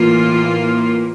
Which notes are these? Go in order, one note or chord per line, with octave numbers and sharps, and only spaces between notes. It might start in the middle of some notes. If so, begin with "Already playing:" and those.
Already playing: A2 E3 A#3 F4